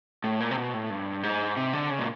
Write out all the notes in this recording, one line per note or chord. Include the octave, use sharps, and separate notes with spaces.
A2
A#2
C3
B2
A2
G2
G#2
C3
D3
C#3
A#2